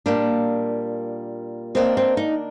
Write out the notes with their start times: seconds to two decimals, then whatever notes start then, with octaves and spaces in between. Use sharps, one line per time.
0.06 A#2 G3 A#3 D4
1.75 D#3 A#3 C4 D4
1.97 C4
2.17 D#4